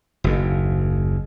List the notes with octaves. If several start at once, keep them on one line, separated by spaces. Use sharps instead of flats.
F#1 D#2